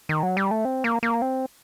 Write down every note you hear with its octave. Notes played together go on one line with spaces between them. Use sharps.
D#3
F#3
G3
A3
C4
A#3
A#3
C4